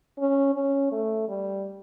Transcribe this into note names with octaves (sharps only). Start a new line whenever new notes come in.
C#4
C#4
A3
G3